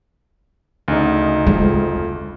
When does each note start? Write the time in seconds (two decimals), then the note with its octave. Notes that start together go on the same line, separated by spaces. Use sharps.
0.88 D2 C#3 D#4
1.46 F2 G#3